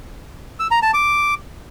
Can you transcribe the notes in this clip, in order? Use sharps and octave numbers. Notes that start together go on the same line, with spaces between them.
E6
A#5
A5
D6